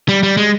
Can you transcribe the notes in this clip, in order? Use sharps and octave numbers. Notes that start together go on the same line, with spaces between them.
G3
G3
G#3